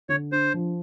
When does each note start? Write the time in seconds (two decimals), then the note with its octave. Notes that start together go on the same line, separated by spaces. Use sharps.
0.09 D3 C#5
0.32 D4 C5
0.54 F3